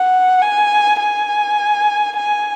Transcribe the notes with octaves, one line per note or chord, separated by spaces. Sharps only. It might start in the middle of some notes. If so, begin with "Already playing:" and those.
Already playing: F#5
G#5
G#5
G#5